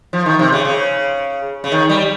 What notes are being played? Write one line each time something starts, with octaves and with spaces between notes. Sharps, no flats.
F3
D#3
C3
C#3
C#3
C#3
D#3
G3